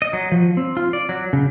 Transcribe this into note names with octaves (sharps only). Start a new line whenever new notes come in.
D#5
F#3
F3
C4
F4
D5
F#3
C#3